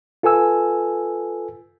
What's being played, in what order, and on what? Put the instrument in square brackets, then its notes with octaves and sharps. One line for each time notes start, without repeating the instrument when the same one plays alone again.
[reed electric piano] F4 A4 B4 G#5 E6